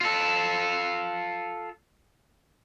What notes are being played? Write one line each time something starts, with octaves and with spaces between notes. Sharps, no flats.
F4 A4